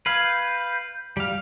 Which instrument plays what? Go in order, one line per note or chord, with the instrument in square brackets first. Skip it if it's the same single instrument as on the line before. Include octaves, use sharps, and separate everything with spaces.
[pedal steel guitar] B4 F5 [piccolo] G#6
[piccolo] G6
[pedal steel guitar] G3 F5